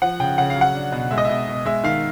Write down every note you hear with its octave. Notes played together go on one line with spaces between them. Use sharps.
F3 F#5
C#3 G5
C#3 F#5
F5
F#3
F#5
D4
B2
G#3 E5
D#5
B2 E5
B2
G#3 E5
D#3 F5